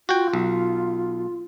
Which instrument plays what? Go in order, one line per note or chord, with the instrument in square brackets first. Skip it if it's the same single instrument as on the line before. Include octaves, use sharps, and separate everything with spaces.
[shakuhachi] F4 [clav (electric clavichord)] F#4 G5
[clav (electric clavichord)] B1